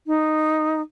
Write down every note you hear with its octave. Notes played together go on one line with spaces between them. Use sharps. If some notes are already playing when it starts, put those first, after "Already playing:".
D#4